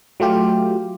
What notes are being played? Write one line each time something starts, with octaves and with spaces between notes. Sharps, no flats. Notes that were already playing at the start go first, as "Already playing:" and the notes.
F#3 A3 F4 G4